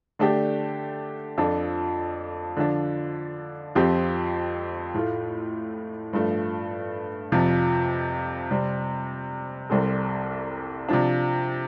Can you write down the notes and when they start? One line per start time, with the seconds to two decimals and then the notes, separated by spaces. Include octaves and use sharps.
0.19 D3 A3 D4 G4
1.38 F2 F3 D4 A4
2.57 D3 F3 D4
3.75 F2 F3 C4 G4
4.94 A2 A3 F4
6.13 G2 F3 A3
7.32 F2 C3 F3
8.51 C3 G3 C4
9.70 C2 C3 G3 C4 A4
10.89 C3 F3 D4